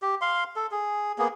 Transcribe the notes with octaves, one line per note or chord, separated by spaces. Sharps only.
G4
F5 C6
A4
G#4
A#3 B3 G#4